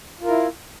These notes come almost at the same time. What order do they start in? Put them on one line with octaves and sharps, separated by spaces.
F4 A#4 E4